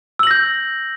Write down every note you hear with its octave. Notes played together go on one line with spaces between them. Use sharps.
E6 G6 A#6 F#7